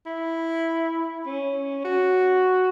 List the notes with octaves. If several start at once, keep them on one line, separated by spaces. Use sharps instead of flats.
E4
C#4
F#4